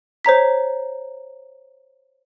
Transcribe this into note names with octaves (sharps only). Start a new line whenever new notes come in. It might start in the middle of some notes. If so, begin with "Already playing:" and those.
C5 C#5 A#5 B6